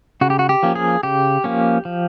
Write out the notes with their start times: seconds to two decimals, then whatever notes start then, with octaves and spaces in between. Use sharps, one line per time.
0.21 C#3 F#4
0.30 G4
0.39 F#4
0.49 G4
0.63 F3 A#3 C#4
0.75 G#4
1.03 C#3 G4
1.44 F3 A#3 C#4
1.85 F3